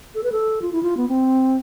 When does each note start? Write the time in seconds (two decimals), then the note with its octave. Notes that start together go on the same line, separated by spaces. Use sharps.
0.15 A4
0.24 B4
0.32 A4
0.62 F4
0.73 E4
0.83 F4
0.97 B3
1.08 C4